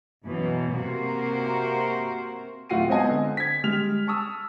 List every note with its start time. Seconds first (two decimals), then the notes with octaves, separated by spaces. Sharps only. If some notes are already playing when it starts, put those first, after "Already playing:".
0.25 F#2 B2 E3
0.75 C3 A#3 F#4 A#4 C5
2.69 D1 A2 F4 F#4 C7 D#7
2.88 G#3 B3 C4 C5 D#5 G#5
3.09 D3
3.37 G#6 B6
3.64 G3 G#3 F6 F7
4.07 A5 C#6 D#6 E6